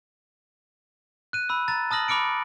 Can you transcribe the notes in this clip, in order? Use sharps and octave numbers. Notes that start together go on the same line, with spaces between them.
F#6 D#7
B5 E6
A#5 A6
A5 D#6 F6 A#6 F#7
B5 D6 F6 C#7 D7